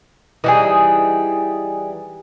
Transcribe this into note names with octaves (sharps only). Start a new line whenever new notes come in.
E3 G3 D#4 F#4 G#4